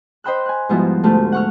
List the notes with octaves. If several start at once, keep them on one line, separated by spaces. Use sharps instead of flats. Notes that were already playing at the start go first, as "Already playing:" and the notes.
C5 D#5 G5 B5 E6 F#6
G#5 F#6
G#2 F3 G3 B3 E4 F#4
D2 G#2 A3 F4 G4 A5
F#5 C#6 F6